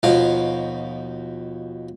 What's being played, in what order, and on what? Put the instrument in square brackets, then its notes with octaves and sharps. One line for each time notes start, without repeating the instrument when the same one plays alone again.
[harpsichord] D#2 B2 F3 F5